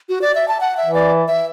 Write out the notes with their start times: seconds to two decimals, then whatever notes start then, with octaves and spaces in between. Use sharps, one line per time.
0.09 F#4
0.22 D5
0.35 E5
0.48 A5
0.61 F#5
0.77 E5
0.86 E3
0.94 D5
1.28 E5